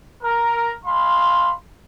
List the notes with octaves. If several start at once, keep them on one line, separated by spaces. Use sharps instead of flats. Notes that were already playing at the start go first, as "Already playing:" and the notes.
A#4
G#3 F5 B5 C6